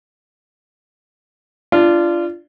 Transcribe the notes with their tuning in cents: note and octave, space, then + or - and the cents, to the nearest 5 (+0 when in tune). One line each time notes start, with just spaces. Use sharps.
D4 +0 F4 -25